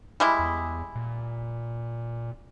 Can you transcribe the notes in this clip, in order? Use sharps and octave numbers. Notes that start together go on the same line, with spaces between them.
G3 G#3 E4
E2
A#2